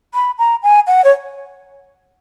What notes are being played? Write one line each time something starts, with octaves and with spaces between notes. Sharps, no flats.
B5
A#5
G#5
F#5
C#5